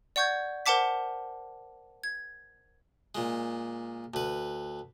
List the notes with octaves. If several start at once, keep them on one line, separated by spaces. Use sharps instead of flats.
D5 F#5 C#6 G6 G#6
A#4 C5 F#5 A5 D6 B6
G#6
A#2 G#3
D2 B4